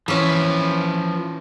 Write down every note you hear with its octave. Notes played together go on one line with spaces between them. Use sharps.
E3 F3 C#4 B4